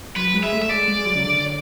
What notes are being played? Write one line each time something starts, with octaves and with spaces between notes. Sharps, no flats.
F#3 B4
G#3
E5
A3
E5
G#3 D5
G#3
F#3
C#3
D3